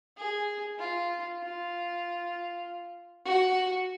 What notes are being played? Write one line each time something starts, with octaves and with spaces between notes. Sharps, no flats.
G#4
F4
F4
F#4